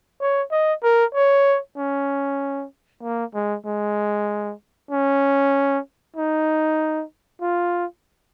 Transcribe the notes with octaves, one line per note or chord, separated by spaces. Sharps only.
C#5
D#5
A#4
C#5
C#4
A#3
G#3
G#3
C#4
D#4
F4